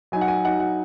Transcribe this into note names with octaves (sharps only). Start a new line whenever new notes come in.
F#3 D#4 G#5
F#5
G#5
F#3 D#4 F#5
F#5